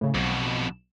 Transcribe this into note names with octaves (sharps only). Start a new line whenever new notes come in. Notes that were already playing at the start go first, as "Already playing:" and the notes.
A2 C#3
B1 F2 B2